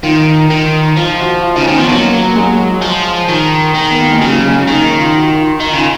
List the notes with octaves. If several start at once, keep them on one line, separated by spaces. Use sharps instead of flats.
D#3 F4
D#3
F3 F4
F#4
F4
C#3 D#4
D#3 C#4
F3 B3
F#3 A#3
A#3
G#3
F3
D#3
D#3
B3
A#3
G#3
C#3 F#3
F#3
G#3
A#3
D#3 C#4
D#4
F4
F#4
F4
D#3 D#4
C#3 F4